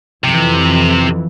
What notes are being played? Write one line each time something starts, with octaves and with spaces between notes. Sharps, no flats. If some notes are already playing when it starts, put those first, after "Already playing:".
F2 C3 E3